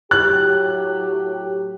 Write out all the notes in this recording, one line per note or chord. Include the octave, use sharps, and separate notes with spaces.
A2 F#3 G4 F#6